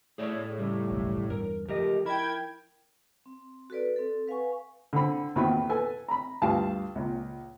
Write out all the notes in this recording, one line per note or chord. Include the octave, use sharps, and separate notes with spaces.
A2 G#4 C#5 D5
F2 C#3 G3
F#1 B1 E2
E2 G2 A#4
C#2 F3 A3 G4 A#4 D#5
E4 A#4 G5 B5 G#6
C4
F#4 A4 B4 D5
C4 A4
B4 F5 F#5 G#5 C#6
D3 C4 B5
E2 A#2 D#3 C4 F#4 B5
A4 B4 G#5
A#5 B5
D2 G2 G3 F4 F5 A5
C#2 A#2